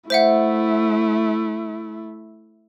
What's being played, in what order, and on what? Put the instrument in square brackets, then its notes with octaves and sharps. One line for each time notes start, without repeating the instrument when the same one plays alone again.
[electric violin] A3 E4 [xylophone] C5 E5 F#5